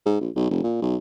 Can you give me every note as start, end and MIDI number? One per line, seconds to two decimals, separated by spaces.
0.06 0.17 44
0.20 0.30 34
0.36 0.49 35
0.50 0.63 29
0.63 0.81 46
0.82 0.96 35